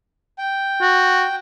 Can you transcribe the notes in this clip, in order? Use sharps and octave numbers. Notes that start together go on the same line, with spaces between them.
G5
F#4